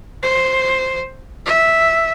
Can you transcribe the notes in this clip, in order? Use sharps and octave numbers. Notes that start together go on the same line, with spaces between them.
C5
E5